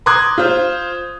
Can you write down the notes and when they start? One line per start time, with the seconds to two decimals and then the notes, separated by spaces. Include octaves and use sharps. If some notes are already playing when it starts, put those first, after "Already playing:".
0.06 A#5 C6 D6 D#6 F#6 G#6
0.38 F4 C5